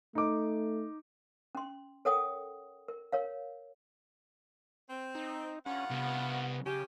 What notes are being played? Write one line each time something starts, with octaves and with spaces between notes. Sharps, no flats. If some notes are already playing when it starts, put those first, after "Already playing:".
A3 D#4 D6
C#4 C6
A4 A#4 C#5 F#5 G5 D#6
A#4
A#4 C#5 F5
C4
D#4
G2 C#4 F4 F#5
C2 B3
C#3 C#4 G4